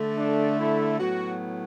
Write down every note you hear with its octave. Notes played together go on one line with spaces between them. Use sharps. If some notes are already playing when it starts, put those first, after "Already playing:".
Already playing: D3 A3
D4
E4
A2 F#3 B3 F#4